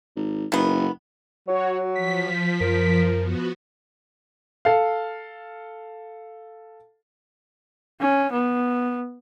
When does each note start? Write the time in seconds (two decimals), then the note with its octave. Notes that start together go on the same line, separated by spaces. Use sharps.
0.16 G#1
0.52 F#1 D#3 B3
1.48 F#3 F#4 C#5
1.96 F3 B6
2.61 F#2 A#4
3.21 B3 F#4
4.65 A4 F5
8.01 C#4
8.32 B3